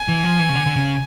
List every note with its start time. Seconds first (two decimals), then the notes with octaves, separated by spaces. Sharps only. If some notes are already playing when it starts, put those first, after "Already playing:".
Already playing: G#5
0.08 E3
0.24 F3
0.39 E3
0.49 C#3
0.55 D3
0.66 D3
0.76 C#3